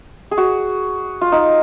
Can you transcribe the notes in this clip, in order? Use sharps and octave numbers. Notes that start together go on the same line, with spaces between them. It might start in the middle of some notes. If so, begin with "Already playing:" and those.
G#4
F#4
F4
D#4